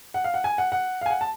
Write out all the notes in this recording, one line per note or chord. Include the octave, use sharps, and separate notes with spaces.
F#5
F5
F#5
G#5
F#5
F#5
F5
G#5
F#5
A5